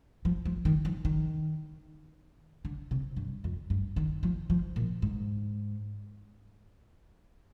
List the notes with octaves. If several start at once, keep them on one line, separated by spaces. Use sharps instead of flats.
F3
F3
D#3
F3
D#3
D3
C3
G2
F2
G2
D#3
F3
F3
A#2
G#2